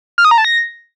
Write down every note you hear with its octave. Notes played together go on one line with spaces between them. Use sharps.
F6
D#6
A#5
A5
A#6